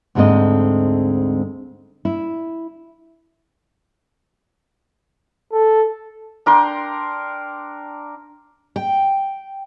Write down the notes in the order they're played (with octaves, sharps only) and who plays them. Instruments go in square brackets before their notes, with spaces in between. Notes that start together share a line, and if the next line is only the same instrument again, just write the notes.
[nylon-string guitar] D2 G#2 G#3 A3 C4 D#5
E4
[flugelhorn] A4
[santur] D4 A#4 G5 C6
[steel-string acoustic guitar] G5